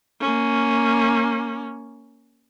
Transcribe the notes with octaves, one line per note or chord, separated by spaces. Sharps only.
A#3 C#4